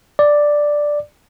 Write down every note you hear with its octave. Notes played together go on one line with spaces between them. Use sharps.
D5